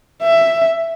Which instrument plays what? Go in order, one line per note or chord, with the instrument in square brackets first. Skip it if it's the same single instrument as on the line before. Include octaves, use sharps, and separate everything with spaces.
[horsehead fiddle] E5